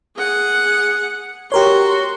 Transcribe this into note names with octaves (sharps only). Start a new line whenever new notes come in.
G#4 F#5
F#4 G4 A#4 C#5 C6